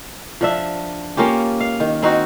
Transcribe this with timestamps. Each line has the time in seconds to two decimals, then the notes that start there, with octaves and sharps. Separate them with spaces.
0.41 F3 D4 E5
1.17 A#3 C#4 F4 G4
1.60 F5
1.80 D#3
2.02 C4 D#4 F#4